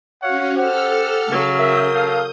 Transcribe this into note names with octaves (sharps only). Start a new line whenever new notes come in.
C#4 F#4 C#5 F5 F#5
G4 A4 C5 F#5 E6 F6
C#3 F#3
A#4 E5 D#6 G6
A4 F5